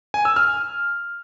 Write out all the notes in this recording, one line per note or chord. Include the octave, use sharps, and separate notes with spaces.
G#5
E6
F6